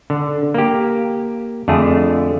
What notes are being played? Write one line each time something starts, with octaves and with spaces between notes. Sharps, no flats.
D3
A#3 G4
F2 D3 A3 G#4